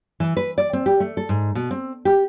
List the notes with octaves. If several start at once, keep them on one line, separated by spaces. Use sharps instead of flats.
E3
B4
D5
C4
G4
A3
A4
G#2
B2
C4
G4